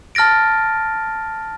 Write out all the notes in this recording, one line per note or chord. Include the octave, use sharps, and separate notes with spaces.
A5 F6 A6 A#6 D7